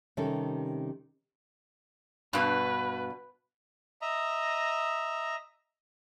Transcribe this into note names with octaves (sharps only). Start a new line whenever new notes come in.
C3 D#3 G3 C#4 A4
G2 B2 B4
D#5 E5 A#5